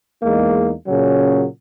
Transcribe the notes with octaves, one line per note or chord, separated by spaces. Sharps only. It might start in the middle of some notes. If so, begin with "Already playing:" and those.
E2 G#3 A#3 D#4
A#2 C#3 F#3 C#4